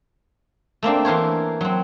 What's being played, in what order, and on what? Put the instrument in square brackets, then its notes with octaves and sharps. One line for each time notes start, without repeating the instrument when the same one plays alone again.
[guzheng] A3 A#3 C4 D4
E3 A#4 C5 C#5
F#3 C4